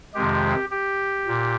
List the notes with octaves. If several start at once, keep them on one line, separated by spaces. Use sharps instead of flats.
F2 C3 D#3 G#3 G4
G4
A#2